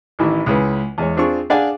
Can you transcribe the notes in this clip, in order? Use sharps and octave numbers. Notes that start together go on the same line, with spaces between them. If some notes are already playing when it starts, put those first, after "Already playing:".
A1 D#3 E3 E4
C#2 C#3 E4 B4
E2 G#3 C#5
C4 D4 F4 G#4 C#6
D4 G#4 D5 F5 F#5 G#5